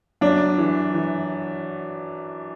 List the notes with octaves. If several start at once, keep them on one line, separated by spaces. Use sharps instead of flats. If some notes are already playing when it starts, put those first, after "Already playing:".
F#2 D4
E3
E3